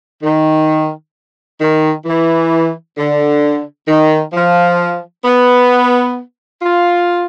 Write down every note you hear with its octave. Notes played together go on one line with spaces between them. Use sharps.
D#3
D#3
E3
D3
D#3
F3
B3
F4